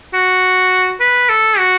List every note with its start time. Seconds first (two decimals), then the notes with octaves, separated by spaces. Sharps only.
0.13 F#4
1.00 B4
1.29 A4
1.58 F#4